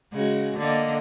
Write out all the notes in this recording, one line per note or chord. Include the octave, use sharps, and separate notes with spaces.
C#3 G#3 F#4
D3 A#3 D#5